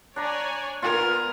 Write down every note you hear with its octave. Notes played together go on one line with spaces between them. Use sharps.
D4 C#5 D5 G#5 A#5
B3 F4 A#4 G#5